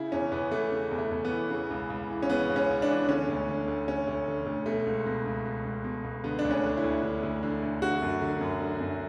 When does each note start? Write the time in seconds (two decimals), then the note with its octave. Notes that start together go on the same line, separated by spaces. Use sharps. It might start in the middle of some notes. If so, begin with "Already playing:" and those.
Already playing: C#3 E4
0.12 E2 C#4
0.32 E2 B3
0.51 E3 A3
0.72 C#3
0.91 E2
0.98 A3
1.11 E2
1.25 B3
1.31 E3
1.50 C#3
1.70 C#2
1.90 C#2
2.10 E3
2.23 C#4
2.29 C#3 B3
2.50 C#2
2.56 C#4
2.70 C#2
2.82 D4
2.88 E3
3.08 D3 C#4
3.28 D2
3.48 D3
3.68 D2
3.88 D3 C#4
4.08 D2
4.28 D3
4.46 D2
4.66 B2 A3
4.87 C#2
5.06 B2
5.26 C#2
5.46 B2
5.65 C#2
5.84 B2
6.04 C#2
6.24 D3 B3
6.39 D4
6.45 D2
6.51 C#4
6.64 D3
6.77 E4
6.84 D2
7.03 D3
7.23 D2
7.43 D3
7.63 D2
7.82 D3 F#4
8.02 F#2
8.21 D3
8.41 F#2
8.61 D3
8.81 F#2